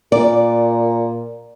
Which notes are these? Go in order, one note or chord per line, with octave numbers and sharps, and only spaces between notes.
A#2 D5